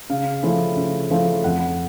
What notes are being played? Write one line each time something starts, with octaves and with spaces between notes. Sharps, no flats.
C#3 F5
F3 A3 C#4 E4
C#3
F3 A3 C#4 E4
F2 F#5